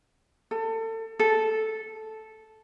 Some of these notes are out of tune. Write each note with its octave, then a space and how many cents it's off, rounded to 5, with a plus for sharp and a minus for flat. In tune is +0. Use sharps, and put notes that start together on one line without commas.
A4 +30
A4 -5